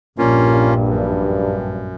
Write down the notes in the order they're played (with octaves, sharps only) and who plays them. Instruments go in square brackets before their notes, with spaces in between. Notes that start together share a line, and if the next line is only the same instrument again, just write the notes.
[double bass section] A#1 [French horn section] G2 [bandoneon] A#3 C#4 F4
[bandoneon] F#2